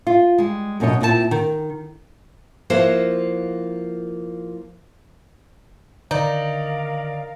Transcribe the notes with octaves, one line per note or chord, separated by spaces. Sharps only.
F4
G3 G#3
F#2 B2 D4 C#5 D#5
A#2 C4 E4 C#5 A5
D#3
F3 A#3 E4 F#4 C5
D3 D#3 D#4 A#4 D5 F5